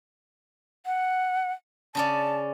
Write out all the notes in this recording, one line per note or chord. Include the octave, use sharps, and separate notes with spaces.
F#5
C#3 C#4 D5 A5